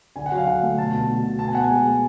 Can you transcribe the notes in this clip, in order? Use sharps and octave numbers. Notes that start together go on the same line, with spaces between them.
D3 G#5
F#5
F#3
F5
D3 F#5
A3
B2 A5
B2
B2
B2
B3 A5
G#5
B3 F#5
G#5
G#3
G#3